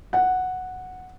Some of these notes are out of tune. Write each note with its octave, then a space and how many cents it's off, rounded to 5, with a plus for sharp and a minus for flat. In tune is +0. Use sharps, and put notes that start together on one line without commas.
F#5 -5